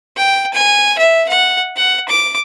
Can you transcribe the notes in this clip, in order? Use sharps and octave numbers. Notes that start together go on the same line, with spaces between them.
G5
G#5
E5
F#5
F#5
D6